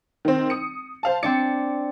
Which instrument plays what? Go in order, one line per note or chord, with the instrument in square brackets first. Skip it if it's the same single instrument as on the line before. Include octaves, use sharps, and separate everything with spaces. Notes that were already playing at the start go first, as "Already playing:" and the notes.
[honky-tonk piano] D#3 C4
D#6 C#7
C5 F5 A5
[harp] C4 D4 D5 [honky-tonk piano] C#7